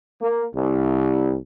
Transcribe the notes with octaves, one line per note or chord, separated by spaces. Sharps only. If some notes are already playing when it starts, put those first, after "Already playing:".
A#3
C2